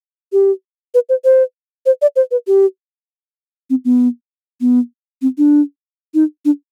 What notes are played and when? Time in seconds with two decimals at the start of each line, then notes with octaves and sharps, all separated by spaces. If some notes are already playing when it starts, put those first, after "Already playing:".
0.33 G4
0.94 B4
1.09 C5
1.24 C5
1.86 C5
2.02 D5
2.16 C5
2.31 B4
2.47 G4
3.70 C4
3.85 B3
4.61 B3
5.22 C4
5.38 D4
6.14 D#4
6.45 D4